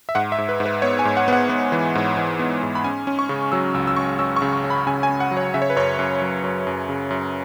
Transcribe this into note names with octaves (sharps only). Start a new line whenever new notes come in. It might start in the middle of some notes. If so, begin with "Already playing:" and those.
E5
G#2 F#5
E5
G#2
B4
G#2
B4
B3 C#5
G#5
G#2
F#5
B3 F#5
B3
E3
G#2
E3
B3
G#2
B5
C#4 G#5
C#4
C#6
C#3
F#3 E6
C#2 E6
E6
C#2 C#6
C#4 E6
C#6
C#3
C#6
C#4
B5
C#3 G#5
G#5
C#4
F#5
F#3
C#5
C#3 E5
C#5
B4
F#2 C#5
F#2
F#3
F#2
F#2
C#3
F#2